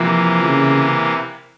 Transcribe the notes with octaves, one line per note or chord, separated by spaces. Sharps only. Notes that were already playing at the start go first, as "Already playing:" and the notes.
Already playing: C3 E3 F3 A#3
C#3